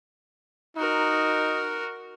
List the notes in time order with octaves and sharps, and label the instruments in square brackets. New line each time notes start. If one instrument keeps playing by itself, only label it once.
[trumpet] D#4 [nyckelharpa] F#4 A#4